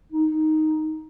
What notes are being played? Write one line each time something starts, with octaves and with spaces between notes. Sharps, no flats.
D#4